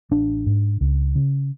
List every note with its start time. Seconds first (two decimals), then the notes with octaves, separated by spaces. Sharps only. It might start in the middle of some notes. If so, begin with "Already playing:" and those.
0.11 A1 D4
0.46 G#2
0.81 C#2
1.15 C#3